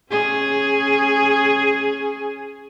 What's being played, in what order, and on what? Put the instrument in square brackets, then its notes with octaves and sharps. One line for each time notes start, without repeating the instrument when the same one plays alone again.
[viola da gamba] C#4 G#4